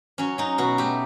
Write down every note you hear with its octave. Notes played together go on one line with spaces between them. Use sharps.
F#3 C#4
F#3 D#4
B2 F#4
A3 G4